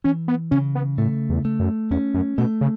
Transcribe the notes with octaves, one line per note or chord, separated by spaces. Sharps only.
E3 C#4
B3
C#3 C#4
B3
A2 A3
E2
A3
F#2
E2 C#4
F#2
B2 A3
C#3